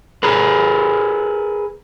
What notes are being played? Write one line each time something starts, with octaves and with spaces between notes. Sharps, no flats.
G#4 A#4 B4